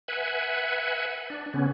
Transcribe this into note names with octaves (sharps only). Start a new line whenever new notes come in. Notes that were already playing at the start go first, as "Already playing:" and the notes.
B4 E5 F#5 G#5
D4
C#3 B3 C#4